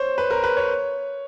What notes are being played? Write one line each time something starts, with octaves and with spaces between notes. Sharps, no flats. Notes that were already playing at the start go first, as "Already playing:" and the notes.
Already playing: C5 C#5
B4
A#4
B4
C#5